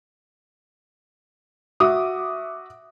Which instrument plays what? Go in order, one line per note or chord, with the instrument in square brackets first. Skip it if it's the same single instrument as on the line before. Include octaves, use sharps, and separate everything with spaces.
[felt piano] F#4 E5 D6 D#6